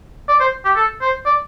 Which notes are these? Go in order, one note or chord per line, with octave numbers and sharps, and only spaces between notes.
D5
C5
G4
A4
C5
D5